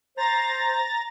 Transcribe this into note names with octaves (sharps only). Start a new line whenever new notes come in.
C5 A#5 A6 A#6